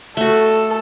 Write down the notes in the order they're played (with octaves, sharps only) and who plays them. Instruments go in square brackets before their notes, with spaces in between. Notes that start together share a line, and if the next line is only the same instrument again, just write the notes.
[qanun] A3 F#4 [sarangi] A4